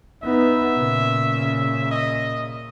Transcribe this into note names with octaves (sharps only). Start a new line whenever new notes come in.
B3 D#4 E5
A#2 C#3
D#5